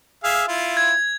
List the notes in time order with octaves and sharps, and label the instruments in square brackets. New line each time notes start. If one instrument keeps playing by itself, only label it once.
[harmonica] G#4 E5 F5
E4 F4
[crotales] G#6